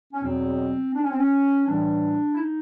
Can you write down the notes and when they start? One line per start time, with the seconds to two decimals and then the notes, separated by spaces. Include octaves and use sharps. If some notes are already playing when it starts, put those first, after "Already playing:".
0.13 C#4
0.23 E2 B2 F#3 C4
0.95 D4
1.03 C#4
1.11 C4
1.19 C#4
1.67 A2 E3 G3 D4
2.33 E4
2.39 D#4